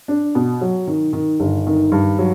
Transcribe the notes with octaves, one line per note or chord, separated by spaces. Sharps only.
D4
B2
F#3
D#3
D#3
G1
D#3
G2
F#3